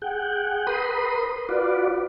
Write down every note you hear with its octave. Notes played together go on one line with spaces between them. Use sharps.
G#4 F#5 G5
A#4 B4 B5 C6 D#6
F4 F#4 B4 D5